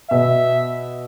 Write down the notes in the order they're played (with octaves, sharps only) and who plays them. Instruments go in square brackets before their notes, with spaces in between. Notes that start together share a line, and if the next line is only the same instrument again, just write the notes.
[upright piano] B2 [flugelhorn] E5